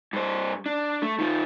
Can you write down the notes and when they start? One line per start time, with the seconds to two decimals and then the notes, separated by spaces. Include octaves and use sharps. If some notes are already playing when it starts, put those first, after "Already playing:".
0.13 G2 C5
0.66 D4
1.02 A3
1.19 D#3 F4